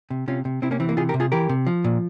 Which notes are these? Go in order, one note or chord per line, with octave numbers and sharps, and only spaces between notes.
C3
C3 C#4 F4
C3
C3 C4 E4
A#3 C#4
E3 C4
A#3
C3 F4 G#4
G4 A#4
C3
F4 G#4
E3 G4 A#4
C3
F3
A#2